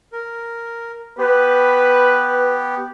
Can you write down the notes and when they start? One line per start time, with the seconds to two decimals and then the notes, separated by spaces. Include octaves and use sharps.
0.13 A#4
1.18 B3 G4 B4